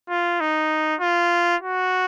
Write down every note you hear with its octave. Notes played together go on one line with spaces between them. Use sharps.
F4
D#4
F4
F#4